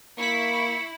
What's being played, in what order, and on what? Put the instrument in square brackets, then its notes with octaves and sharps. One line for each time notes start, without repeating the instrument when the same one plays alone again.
[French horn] A#3 [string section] E4 [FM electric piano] C#6 B6 [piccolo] C#7